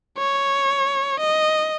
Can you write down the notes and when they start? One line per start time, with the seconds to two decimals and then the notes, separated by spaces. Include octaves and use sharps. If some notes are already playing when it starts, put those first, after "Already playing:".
0.18 C#5
1.19 D#5